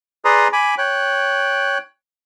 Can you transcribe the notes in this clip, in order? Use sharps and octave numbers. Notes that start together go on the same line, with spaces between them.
G#4 B4 D5 A#5 C6 D#6
G#5 B5 D6
C#5 G5 F#6